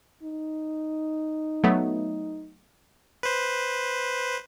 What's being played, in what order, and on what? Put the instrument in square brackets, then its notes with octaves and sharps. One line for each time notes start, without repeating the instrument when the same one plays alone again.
[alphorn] D#4
[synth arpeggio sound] F#3 A3 B3
[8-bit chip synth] B4 C5